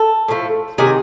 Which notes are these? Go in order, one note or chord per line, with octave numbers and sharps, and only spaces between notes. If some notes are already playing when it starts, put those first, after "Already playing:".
Already playing: A4
A2 F3 A3
C3 D#3 F#3 G#4